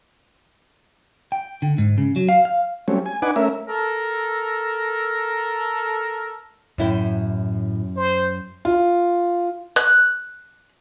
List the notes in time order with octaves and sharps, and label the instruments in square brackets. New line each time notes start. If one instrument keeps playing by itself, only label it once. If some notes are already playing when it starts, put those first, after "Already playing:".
[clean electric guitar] G5
D3
G#2
C#3
F#3
F5
F5
[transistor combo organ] F#3 G3 A3 C4 C#4
G#5
D4 D#4 B4 F#5 G#5 D6
A3 C#4 A#4 E5
[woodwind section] A4 A#4
[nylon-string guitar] F#2 E4 G5 [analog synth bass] A2
[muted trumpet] C5
[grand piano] F4
[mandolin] F#6